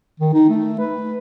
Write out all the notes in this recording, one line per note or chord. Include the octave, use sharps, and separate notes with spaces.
D#3
D#4
A3
B4